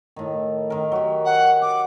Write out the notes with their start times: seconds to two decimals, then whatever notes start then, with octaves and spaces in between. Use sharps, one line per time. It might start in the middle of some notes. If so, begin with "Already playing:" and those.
0.16 A2 D#3
0.70 D#3 A#4
0.92 F#3 G4
1.25 F#5
1.62 F#5 D6